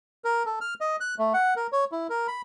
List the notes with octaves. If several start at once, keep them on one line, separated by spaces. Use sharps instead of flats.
A#4
A4
F6
D#5
F#6
A3
F#5
A#4
C#5
E4
A#4
B5